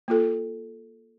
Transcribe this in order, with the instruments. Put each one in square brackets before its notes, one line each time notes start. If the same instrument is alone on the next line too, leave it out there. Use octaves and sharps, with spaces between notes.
[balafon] A#3 F4 A4